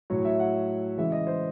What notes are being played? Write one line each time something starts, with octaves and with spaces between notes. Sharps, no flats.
A2 F#3 C#5
E5
F#5
C#3 E3 G#3 E5
D#5
C5